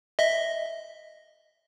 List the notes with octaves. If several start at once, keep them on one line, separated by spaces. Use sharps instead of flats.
D#5 E5